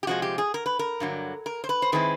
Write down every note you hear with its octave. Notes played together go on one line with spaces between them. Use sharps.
G4
C3 F3 G#3 F#4
G4
G#4
A#4
B4
A#4
G2 D3 F#3
A#4
C5
B4
C5
D#3 G#3 C4 E4 B4